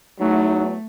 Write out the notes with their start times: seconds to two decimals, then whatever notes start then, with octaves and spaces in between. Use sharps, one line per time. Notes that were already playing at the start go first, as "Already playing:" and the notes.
0.19 E2 F#3 A3 D#4